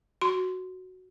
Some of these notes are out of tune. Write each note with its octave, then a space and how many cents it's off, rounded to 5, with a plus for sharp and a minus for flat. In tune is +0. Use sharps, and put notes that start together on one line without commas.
F#4 +0 C6 -15